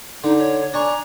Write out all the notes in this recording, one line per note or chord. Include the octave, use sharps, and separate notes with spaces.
D3 D#4
C#5
D4 G#5 A#5 C#6